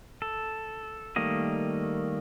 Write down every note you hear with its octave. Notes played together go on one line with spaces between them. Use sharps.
A4
D#3 G3 A3 A#3 D#5